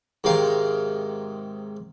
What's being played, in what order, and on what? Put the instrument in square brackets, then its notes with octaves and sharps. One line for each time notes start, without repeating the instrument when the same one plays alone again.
[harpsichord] G#2 C3 D#3 F5 A#5